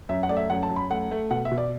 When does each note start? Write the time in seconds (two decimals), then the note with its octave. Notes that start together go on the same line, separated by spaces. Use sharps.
0.09 F#2 E5
0.23 F#5
0.29 A3 D5
0.37 E5
0.50 F#2 F#5
0.63 A5
0.69 F#2
0.76 B5
0.90 A3 F#5
1.11 A3
1.31 B2 F#5
1.45 E5
1.52 B2
1.58 D5